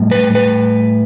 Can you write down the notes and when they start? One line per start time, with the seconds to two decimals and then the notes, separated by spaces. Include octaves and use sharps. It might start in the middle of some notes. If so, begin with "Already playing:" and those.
Already playing: A2 G3
0.11 B4
0.35 B4